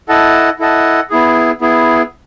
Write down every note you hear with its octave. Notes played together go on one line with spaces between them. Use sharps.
E4 A4 D#5 F#5 A5
E4 A4 D#5 F#5 A5
B3 E4 G#4
B3 E4 G#4